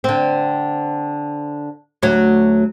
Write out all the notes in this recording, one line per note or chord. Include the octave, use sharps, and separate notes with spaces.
D3 C4
D2 F#3